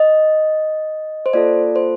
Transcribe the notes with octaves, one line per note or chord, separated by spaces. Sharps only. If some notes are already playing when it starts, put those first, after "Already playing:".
Already playing: D#5
C5
A#3 F4 A4 D5
C5